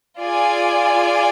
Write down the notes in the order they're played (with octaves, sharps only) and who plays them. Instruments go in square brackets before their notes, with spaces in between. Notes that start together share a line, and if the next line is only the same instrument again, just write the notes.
[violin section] F4 G#4 D5 G#5